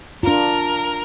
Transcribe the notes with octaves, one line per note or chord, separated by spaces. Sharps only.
D4 F4 A#4